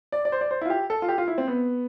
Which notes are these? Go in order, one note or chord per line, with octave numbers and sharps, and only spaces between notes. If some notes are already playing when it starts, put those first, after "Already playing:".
D5
D5
C5
D5
C5
E4
F4
G4
A4
F4
G4
F4
E4
C4
B3